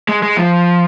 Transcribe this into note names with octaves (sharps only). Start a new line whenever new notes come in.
G#3
G#3
F3